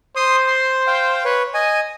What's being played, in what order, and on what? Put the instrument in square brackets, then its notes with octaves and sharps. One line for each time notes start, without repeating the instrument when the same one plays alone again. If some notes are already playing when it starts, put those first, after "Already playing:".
[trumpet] C5 [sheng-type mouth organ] C6 D#6
[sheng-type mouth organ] C6
F5 G5
B4 C#5
D#5 G#5